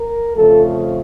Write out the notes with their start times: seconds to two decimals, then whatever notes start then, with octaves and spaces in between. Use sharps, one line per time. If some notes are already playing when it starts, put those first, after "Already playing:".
Already playing: A#4
0.36 F2 C#3 F3 A3 A4